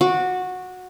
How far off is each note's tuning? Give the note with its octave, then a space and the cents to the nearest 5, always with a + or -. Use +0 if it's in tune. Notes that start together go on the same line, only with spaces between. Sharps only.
F#4 -15 D6 +0